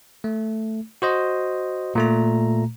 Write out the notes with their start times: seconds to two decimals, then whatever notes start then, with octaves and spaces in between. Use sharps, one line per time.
0.24 A3
1.02 F#4 C5 D#5
1.95 A#2 A3 A#5